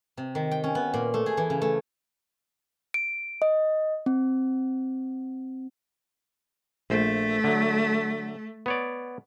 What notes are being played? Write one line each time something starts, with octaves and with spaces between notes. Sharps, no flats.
C3
D#3
G5
C#4
B3
A#2
A3
G#4
E3
C#3
A3
D7
D#5
C4
A#1 A3 C5
D3 F#3
B3 C#5 D5